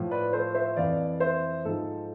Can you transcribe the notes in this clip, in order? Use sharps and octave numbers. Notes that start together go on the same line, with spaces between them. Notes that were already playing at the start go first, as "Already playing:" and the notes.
Already playing: A2 F3
B4 D5
A4 C5
C5 E5
F2 E3 D5 F5
C5 E5
G#2 F3 A4